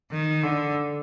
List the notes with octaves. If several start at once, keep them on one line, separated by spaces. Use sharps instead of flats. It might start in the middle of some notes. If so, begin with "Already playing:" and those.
D#3
D3